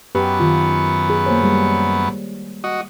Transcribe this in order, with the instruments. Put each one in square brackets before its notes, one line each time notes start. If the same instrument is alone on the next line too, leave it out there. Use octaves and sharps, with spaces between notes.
[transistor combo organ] F#2 B3 [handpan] G4 B4
[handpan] D#3 F4
G#4
A#3 C5 C#5
G3 G#3
[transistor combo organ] F#4 D#5